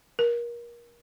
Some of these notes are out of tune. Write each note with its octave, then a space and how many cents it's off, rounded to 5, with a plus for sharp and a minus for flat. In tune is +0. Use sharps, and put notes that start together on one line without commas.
A#4 +25